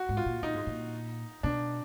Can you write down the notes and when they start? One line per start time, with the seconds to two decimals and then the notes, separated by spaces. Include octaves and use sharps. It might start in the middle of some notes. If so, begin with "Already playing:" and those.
Already playing: F#4
0.09 G#2
0.17 F4
0.26 A#2
0.42 A#2 D#4
0.54 G#2
0.67 A#2
1.43 B2 D4